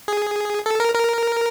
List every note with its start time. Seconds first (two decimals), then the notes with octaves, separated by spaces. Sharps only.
0.08 G#4
0.66 A4
0.80 A#4
0.95 A#4